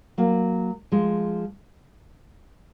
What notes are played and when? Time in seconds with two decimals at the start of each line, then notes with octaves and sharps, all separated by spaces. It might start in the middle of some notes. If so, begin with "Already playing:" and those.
0.18 F#3 A#3
0.92 F3 G#3